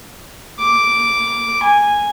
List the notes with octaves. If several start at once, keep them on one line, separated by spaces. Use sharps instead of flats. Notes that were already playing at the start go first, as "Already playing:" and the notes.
D6
G#5